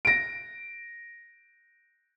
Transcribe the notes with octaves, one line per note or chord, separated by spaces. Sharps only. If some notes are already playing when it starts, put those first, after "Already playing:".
A#6 D7